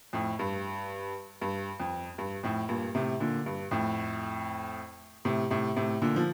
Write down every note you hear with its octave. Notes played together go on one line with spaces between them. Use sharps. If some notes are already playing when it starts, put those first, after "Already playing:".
F2 A2
G2
G2
F2
G2
F2 A2
G2 A#2
A2 C3
A#2 D3
G2
F2 A2
A2 C3
A2 C3
A2 C3
A#2 D3
F3